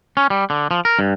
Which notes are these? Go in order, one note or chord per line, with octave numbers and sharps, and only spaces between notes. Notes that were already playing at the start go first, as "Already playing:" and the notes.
C#4
G3
D3
F3
A#4
G2